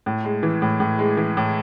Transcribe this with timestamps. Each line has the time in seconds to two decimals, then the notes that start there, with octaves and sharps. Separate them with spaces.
0.06 A2
0.24 G#3
0.43 E3
0.62 A2
0.80 A2
0.99 G#3
1.17 E3
1.37 A2